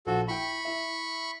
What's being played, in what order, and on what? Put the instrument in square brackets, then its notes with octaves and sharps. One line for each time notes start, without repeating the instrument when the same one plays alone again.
[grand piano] A#1 [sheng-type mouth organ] F#4 A4
[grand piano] E4 G5 [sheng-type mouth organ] B5 C#6
[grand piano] E4 E5